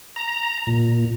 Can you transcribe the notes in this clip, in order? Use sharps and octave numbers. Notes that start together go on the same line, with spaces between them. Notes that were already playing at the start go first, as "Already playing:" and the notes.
A#5
A#2